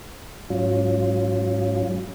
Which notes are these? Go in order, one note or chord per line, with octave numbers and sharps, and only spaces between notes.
G#2 F#3 C#4 F4